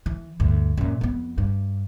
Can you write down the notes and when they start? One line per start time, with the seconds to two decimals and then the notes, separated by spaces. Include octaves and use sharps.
0.06 E3
0.40 D2 G2
0.77 F#2 A#2
1.01 F2 B3
1.38 G2